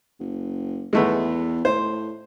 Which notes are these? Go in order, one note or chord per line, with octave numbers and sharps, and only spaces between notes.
F#1
E2 G#3 A3 B3
A2 C5